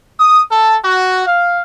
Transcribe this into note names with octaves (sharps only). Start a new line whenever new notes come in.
D#6
A4
F#4
F5